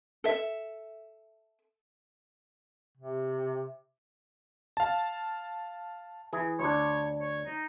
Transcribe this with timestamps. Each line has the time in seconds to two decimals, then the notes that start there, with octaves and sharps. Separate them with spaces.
0.24 A4 E5
2.98 C3
4.77 F5 A5
6.33 E3 G#4
6.60 D2 D4 C#5
7.21 C#5
7.46 D#4